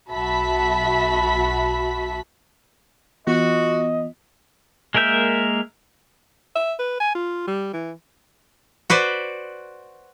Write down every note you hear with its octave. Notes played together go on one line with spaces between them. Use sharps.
B1 F#4 E5 A5 B5 B6
E3 B3 F4 F#4 D#5
G#3 A#3 A#4 E5 G6
E5
B4
G#5
F4
G3
E3
F#4 B4 C5 D5